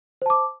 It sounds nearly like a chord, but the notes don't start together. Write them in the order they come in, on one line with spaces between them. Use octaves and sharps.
C5 A5 D6